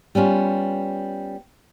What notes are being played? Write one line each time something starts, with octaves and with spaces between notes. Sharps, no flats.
G3 B3 C#4 F4